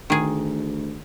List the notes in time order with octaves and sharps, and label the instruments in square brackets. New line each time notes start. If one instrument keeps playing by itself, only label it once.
[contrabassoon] D2 [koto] D#3 G#4